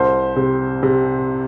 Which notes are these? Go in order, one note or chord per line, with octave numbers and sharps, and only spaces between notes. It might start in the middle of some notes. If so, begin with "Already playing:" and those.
Already playing: C2 C5
C3
C3